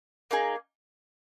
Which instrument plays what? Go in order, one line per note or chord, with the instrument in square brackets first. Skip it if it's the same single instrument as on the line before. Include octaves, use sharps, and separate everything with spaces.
[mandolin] A#3 D#4 G#4